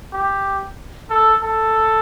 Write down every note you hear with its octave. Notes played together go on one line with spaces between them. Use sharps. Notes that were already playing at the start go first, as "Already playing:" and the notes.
G4
A4
A4